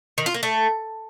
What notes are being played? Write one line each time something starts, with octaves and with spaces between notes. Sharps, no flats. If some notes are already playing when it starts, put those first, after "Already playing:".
D#3
F4
A#3
A3